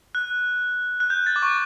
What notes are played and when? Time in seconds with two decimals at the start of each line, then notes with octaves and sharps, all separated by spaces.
0.15 F#6
1.00 F#6
1.10 G6
1.27 A6
1.36 D6
1.42 C#6